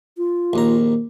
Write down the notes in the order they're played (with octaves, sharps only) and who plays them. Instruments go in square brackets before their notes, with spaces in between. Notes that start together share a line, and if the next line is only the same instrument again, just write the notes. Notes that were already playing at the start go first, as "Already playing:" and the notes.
[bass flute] F4
[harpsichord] A#1 D#2 A#5